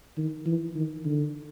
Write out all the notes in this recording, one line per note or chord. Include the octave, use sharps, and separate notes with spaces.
D#3
E3
D#3
D3